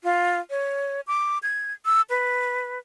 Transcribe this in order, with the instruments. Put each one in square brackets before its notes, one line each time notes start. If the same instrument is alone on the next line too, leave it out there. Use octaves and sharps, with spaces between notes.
[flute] F4
C#5
D6
G#6
E6
B4